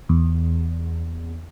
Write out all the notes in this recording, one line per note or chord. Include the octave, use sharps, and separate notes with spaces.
E2